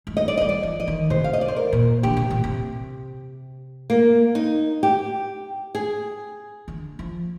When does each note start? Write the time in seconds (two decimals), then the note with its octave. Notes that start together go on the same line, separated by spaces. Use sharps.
0.07 G#3
0.17 G3 D#5
0.28 D5
0.37 D#5
0.41 G3
0.49 D5
0.63 F3
0.80 D#5
0.88 D#3
1.10 C3 C5
1.24 F5
1.33 D#5
1.41 D5
1.48 C5
1.56 A#4
1.73 A#2
2.03 D3 G4
2.17 C3
2.31 A#2
2.44 C3
3.90 A#3
4.35 D#4
4.83 G4
5.75 G#4
6.68 D3
6.99 F3